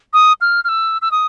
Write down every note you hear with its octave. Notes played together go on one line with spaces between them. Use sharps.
D#6
F6
F6
E6
E6
D#6